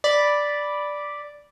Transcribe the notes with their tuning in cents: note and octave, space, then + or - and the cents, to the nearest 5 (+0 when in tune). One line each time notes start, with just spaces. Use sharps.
D5 +0 B5 -5